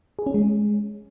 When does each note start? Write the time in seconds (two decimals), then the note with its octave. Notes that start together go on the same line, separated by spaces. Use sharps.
0.19 G#4
0.26 C#4
0.34 G#3